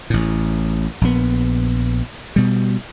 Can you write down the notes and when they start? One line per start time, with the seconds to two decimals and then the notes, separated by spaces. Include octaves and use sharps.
0.10 A1 A2
1.01 A#1 B3
2.36 B2 G3